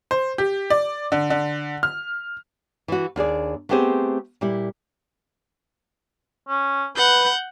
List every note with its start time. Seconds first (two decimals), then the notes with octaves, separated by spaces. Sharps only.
0.11 C5
0.38 G4
0.70 D5
1.12 D3
1.30 D3
1.83 F6
2.88 E3 F#4
3.16 D#2 D4 G#4 D5
3.69 A3 B3 C4 G4 G#4 C5
4.41 A#2 G3 E4
6.48 C#4
6.97 B4 F#5 G6